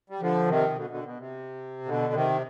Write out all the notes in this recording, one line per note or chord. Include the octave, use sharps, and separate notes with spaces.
G3
D3 F3
C3 D#3
C3
B2 D3
B2 D3
B2
C3
B2 D3
C3 D#3